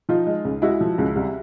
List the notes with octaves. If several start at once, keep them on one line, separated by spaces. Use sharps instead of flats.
F3 D#4 F4
G#3
C#2
G#3 E4 F#4
F3
C#2
C2